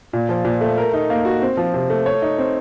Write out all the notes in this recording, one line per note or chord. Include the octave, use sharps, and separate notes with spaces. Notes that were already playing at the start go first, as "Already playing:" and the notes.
A#2
F3
A#2
A3
A#4
D#4
A#3
F#4
C4
F3
C3
A3
C#5
D#4
C4